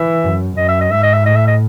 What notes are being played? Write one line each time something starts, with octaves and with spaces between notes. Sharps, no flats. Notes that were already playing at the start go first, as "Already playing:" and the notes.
Already playing: E3 E5
F#2
F#2 D#5
E5
D#5
G#2 E5
D#5
E5
A2 D#5
E5
D#5